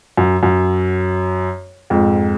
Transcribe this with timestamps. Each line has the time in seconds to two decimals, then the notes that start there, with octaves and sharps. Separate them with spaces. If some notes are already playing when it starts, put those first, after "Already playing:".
0.17 F#2
0.43 F#2
1.90 F2 G#2